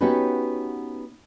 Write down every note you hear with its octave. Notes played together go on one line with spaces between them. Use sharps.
B3 C#4 D#4 F#4 G4 B4